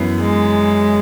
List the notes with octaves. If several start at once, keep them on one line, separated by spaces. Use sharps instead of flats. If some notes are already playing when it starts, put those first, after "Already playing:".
Already playing: F#2 E3 B3
G#3